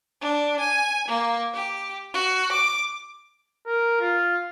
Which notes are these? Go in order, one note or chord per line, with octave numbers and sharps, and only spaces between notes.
D4
G#5
A#3
G4
F#4
D6
A#4
F4